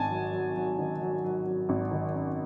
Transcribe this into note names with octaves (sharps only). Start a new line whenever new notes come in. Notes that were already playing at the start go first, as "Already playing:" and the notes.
Already playing: G#1 D#3 G#5 A5
F#3
F#3
F#3
D#3
F#3
F#3
F#3
G#1
D#3
F#2